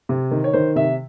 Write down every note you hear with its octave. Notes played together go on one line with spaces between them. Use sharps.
C3
D#3
C#5
D#3 C5
C3 E5